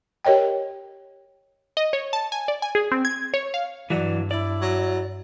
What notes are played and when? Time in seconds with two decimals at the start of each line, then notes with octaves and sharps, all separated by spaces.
0.25 G4 A#4 C#5 D#5 G5
1.77 D#5
1.93 C#5
2.13 A5
2.32 G#5
2.48 D5
2.62 G#5
2.75 G#4
2.92 C4
3.05 G#6
3.34 C#5
3.54 F5
3.90 G2 E3 F#3 D5
4.31 E4 D5
4.61 F#3